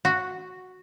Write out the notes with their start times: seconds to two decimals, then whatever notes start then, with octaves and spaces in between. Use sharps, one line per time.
0.05 F#4